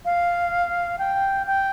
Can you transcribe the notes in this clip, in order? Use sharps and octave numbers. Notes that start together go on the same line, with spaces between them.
F5
G5
G5